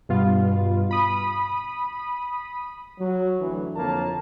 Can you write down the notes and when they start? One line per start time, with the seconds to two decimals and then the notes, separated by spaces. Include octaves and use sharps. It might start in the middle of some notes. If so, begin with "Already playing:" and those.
0.09 G2 B2 B3 F4
0.91 B5 D#6
2.99 F#3
3.40 D2 E3
3.76 F2 D3 A#3 A#4 C#5 A5